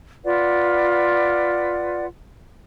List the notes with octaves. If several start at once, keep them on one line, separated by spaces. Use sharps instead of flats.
F4 B4 D5 F#5